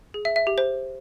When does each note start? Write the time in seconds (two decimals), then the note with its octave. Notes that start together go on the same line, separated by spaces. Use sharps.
0.14 G#4
0.25 E5
0.36 E5
0.47 G4
0.58 C5